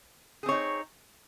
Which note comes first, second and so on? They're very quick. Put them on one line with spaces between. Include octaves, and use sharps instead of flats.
G#4 C4 C#5 D#4